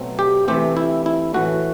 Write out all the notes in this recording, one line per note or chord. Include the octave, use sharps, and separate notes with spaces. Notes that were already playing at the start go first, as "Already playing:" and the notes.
Already playing: B2 F#3 A3 C4
G4
C3 E3 A3 C4 G4
E4
E4
A2 E3 A3 F#4